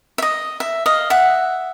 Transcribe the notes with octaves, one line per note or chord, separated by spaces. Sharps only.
E5
D#5
E5
D#5 F5
E5 F#5